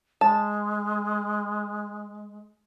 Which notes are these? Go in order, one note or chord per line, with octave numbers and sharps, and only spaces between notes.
G#3 A5